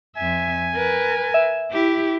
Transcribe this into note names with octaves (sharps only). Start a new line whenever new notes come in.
F2 E5 G#5
A#4 B4
E5
E4 G4